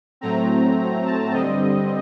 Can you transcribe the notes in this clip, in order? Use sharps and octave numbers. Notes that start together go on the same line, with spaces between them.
A2 F#3 A3 C4 A#5
A5
G2 D3 G3 C4 D#5